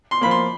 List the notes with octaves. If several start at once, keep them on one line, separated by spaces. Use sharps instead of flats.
C6
F3 A#3 B5
C6